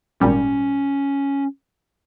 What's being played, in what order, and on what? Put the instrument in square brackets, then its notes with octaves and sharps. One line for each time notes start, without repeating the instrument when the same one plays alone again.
[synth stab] G#1 A#2 G3 [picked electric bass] C#4